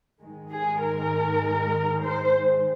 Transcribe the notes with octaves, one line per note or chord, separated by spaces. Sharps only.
G#2 D#3 G#3
G#4
A#4
C5